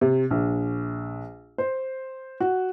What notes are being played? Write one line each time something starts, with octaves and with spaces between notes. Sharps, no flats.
C3
A#1
C5
F#4